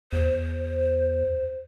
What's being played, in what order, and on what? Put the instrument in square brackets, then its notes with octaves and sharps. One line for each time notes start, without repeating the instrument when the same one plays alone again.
[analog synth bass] E2 [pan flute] C5